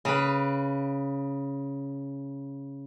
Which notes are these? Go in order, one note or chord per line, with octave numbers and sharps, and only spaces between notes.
C#3 B4